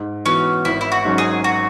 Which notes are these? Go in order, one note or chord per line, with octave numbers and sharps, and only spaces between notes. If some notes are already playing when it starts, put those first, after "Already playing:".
Already playing: G#2
E3 B3 C#4 F#4
G#1 E4
E4
F#4
G#2 F#3 C#4
G#4
F#4